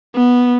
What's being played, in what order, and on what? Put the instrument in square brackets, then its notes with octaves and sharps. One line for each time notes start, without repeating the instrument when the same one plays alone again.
[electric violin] B3